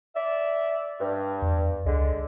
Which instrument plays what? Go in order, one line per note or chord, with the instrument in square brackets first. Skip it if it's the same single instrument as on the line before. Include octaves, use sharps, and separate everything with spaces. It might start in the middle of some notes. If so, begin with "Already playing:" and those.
[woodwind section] D5 E5
G2
[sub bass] E2
[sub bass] C#2 [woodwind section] D3 G#3